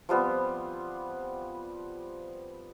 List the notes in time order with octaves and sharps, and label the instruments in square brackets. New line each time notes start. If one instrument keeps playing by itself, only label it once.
[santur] F3 G3 B3 C4